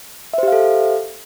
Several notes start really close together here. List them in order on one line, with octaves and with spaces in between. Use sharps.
E5 C5 G4 F5 A4